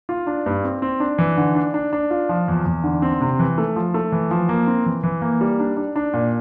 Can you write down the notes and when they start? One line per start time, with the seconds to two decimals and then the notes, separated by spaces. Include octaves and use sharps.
0.09 F4
0.27 D4
0.46 G2
0.65 C4
0.82 C4
1.00 D4
1.18 E3
1.38 D3
1.55 D4
1.74 D4
1.93 D4
2.10 F4
2.29 F3
2.48 E2
2.65 E2
2.84 D3
3.02 C4
3.21 C3
3.39 E3
3.58 A3
3.76 F3
3.94 A3
4.12 E3
4.31 F3
4.49 A#3
4.67 C4
4.86 E3
5.03 E3
5.22 A#3
5.41 G3
5.59 D4
5.77 D4
5.96 D4
6.13 A#2